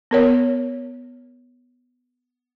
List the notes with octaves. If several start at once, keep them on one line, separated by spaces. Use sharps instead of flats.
B3 A#4 C#5